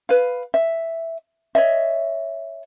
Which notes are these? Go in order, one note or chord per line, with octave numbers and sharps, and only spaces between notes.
B4 F5
E5
C#5 D#5 E5